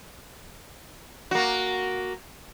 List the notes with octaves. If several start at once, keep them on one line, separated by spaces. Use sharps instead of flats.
A#3 F#4